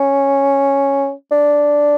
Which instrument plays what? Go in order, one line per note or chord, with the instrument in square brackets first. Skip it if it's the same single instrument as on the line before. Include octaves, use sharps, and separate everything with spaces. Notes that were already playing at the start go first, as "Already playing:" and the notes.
Already playing: [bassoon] C#4
D4